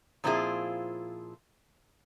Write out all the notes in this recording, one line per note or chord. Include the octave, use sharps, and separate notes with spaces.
A#2 F3 C4 E4 F4 G#4